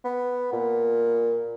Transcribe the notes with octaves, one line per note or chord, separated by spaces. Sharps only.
B3
A#2